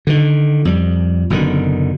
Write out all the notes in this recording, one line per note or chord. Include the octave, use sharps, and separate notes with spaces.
D3 D#3
F2 G3
F#1 B2 D3 D#3